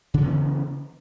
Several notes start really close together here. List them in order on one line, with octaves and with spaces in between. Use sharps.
C#3 C#4 E3 B3